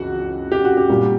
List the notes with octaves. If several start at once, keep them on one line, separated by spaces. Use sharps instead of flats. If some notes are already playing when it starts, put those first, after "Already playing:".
Already playing: C#2 C#3 E3 F#4 F#5
G4
F#4
G4
A#2 G3 A#3